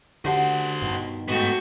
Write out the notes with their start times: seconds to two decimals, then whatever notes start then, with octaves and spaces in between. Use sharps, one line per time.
0.25 D3 F#4 G4 C5 F#5
0.82 G2 B2 D#3
1.28 G#2 A3 B3 F#4 G5